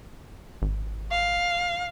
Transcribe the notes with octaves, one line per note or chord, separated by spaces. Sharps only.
G#1
F5